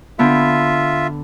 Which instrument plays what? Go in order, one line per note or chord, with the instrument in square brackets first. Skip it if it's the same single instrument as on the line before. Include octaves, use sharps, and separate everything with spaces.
[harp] D3 B3 [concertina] F4 E5